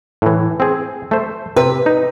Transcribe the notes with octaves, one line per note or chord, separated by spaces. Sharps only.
A2 E3
C4 G#4
A3 C5
C3 B4
D#4